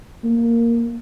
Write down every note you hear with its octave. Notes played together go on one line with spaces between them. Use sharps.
A#3